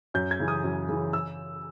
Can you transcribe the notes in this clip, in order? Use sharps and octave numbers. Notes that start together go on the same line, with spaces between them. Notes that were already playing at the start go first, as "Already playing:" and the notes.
F#2 G6
G#6
C#3 E3
D#6
F#2
C#3 E3
E6